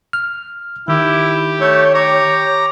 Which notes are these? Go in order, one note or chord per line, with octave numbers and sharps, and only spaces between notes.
F6
D#3 E4 G4
A3 C#5
G4 C#5 A#5